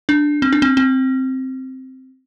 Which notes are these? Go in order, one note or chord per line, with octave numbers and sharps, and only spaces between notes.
D4
C4
D4
C4
C4